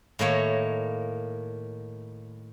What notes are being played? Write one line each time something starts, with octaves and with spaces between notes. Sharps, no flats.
A2 D#3 A#3 C#5